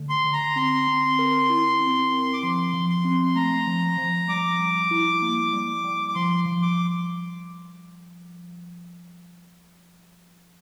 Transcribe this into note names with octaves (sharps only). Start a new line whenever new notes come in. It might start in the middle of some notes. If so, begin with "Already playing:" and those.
Already playing: D3 A3
C6
D3
A#5
C4 C6
C4
A#4
E4
C4
C4
D6
F3 C6
F3
C6
C4
A3 A#5
F3
F3
G3 D6
G3
E4
A#3
G3
G3
D6
F3 C6
F3
D6